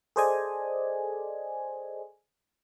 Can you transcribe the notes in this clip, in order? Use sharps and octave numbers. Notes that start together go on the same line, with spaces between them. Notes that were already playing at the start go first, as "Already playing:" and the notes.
G#4 A4 C5 D5 D#5 G#5